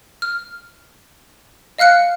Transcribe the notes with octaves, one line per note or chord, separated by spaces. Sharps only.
F6
D#5 F5 F6 F#6 C#7